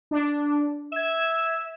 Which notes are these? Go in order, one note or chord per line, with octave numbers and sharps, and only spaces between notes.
D4
E5 G#6 E7